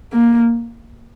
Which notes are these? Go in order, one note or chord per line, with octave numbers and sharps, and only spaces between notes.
A#3